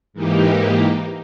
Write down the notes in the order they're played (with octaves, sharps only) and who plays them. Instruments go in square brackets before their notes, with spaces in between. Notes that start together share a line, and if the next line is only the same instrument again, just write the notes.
[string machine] G#2 E3 A#3 D#4 G4